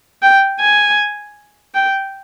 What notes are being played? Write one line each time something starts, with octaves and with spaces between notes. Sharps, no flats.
G5
G#5
G5